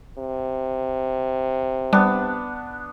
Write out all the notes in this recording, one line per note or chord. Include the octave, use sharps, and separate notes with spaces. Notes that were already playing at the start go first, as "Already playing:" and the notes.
C3
G3 B3 D4